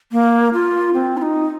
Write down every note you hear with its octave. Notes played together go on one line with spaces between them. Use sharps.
A#3
F4
C4
F4
D#4